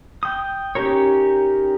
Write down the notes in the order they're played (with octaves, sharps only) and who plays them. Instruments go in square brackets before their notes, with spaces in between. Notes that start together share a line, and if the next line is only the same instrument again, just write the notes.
[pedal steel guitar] G5 D#6
C#4 D#4 G4 A#4 C#5